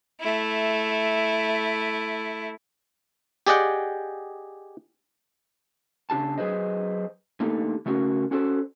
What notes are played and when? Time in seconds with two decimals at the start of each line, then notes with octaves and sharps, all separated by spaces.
0.21 A3 E4
3.47 G4 G#4 D5 D#5 F#5 G5
6.10 C#3 D4 G4 A5
6.38 F#3 G#4 B4 C5 D#5
7.40 D3 A3 A#3 D#4 G4 A4
7.86 C#3 A3 C#4 F#4 A#4
8.31 C#4 F#4 A4 C5 D5